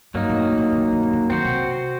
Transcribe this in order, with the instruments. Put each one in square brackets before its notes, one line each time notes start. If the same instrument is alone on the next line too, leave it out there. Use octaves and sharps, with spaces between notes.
[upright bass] G2 [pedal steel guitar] F#3 A#3 D#4
[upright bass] A2
C3
D3
D3
D#3
D3
D#3
D3
[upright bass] D#3 [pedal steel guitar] C4 F#4 C5
[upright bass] C3